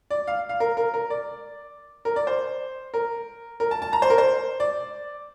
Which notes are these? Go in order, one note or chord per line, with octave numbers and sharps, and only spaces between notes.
D5
F5
F5
A#4
A#4
A#4
D5
A#4
D5
C5
A#4
A#4
A5
A5
A#5
C5
A#4
C5
D5